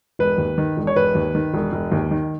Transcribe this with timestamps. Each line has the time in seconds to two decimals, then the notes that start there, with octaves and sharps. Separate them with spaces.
0.19 E1 B4
0.38 D#2
0.58 D#3
0.77 E1
0.87 C#5
0.96 E1 B4
1.15 D#2
1.35 D#3
1.54 E1
1.72 E1
1.92 D#2
2.11 D#3